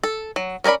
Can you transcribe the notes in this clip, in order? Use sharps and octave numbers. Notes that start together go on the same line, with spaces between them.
A4
F#3
C#4 A#4 C#5 D5 B5